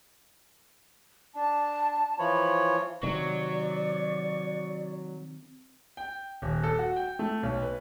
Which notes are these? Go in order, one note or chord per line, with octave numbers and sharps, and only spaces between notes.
D4 A5
E3 F3 C#5 B5
C3 D#3 F#3 D5 C#6
G5
D#1
A4
F#4
G5
A3
B1
B4